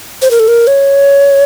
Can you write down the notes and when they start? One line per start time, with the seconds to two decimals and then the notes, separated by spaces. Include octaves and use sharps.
0.22 C5
0.31 A#4
0.40 A4
0.48 A#4
0.67 C#5